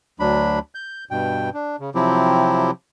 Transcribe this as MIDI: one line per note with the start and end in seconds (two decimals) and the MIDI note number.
0.20 0.59 38
0.20 0.59 54
0.20 0.59 62
0.20 0.59 83
0.75 1.04 91
1.11 1.50 43
1.11 1.50 47
1.11 1.50 79
1.54 1.76 62
1.80 1.90 49
1.95 2.71 48
1.95 2.71 53
1.95 2.71 54
1.95 2.71 60
1.95 2.71 64
1.95 2.71 67